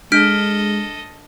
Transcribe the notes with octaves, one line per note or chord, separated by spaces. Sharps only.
G#3 D4 A4 D#5 F6 B6 D7